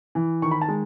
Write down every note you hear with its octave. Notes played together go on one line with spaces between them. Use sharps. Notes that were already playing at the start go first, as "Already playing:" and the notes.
E3
D#3 C#6
B5
A5
G#3